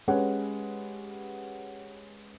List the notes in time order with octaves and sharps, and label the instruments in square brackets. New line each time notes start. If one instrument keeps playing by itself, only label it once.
[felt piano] G#3 C#4 G4 B4 C#5 F#5